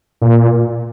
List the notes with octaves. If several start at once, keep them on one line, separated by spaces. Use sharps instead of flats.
A#2